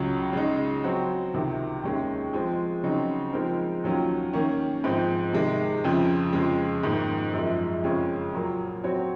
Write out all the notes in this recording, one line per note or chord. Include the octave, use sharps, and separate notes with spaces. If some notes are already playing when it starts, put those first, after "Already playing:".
Already playing: C#2 C#3 F#3
C#3 G#3 D#4
F#3 C4 F#4
C#2 C3 D#3
D#2 D#3 G#3 C#4
F3 G#3 C4
C#3 F#3 C4 D#4
F3 G#3 C4 D#4 A#4
D#2 D#3 F#3 C#4 F4
D#3 A#3 C#4
G#2 F3 C4
C3 D#3 G#3
F2 C#3 F3
F2 C#3 F3 G#3
G#2 D#3 A#3
F#2 F3 G#3
F2 C#3 G#3 C#4 F4
A#2 F#3 A#3
F#3 C4 F#4 C#5